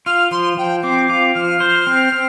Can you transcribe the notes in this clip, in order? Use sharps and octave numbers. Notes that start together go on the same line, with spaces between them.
F4 F6
F3 C6
F3 G5
C4 D6
F4 D6
F3 F6
C5
C4
C4